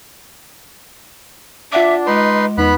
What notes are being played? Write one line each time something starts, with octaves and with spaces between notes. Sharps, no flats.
D4 F4 E5 F#5 D6
G#3 D#4 B4 C6
E2 B3 D#4 B5 F#6